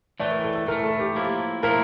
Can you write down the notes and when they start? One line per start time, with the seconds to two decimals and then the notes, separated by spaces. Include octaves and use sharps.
0.20 A2 E3 A3 D5
0.32 A#4
0.44 A4
0.55 A4
0.67 A2 E3 A3 A#4
0.83 A4
1.00 G4
1.15 A2 F3 A#3 E4
1.63 A2 F3 A#3 E4 A#4